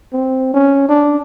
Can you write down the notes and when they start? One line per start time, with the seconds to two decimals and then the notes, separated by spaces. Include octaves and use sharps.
0.13 C4
0.54 C#4
0.89 D4